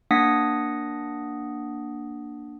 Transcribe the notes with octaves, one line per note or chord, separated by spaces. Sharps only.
A#3 D4 F#5 D#6 A#6 B6